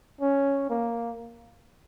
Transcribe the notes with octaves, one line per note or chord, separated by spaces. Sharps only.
C#4
A#3